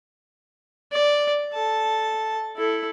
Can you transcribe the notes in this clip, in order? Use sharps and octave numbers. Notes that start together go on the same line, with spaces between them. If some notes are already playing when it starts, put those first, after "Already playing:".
D5
A4 A5
E4 A4